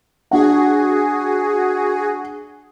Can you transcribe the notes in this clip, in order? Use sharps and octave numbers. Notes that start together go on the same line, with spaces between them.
D4 F#4 G#4 F#5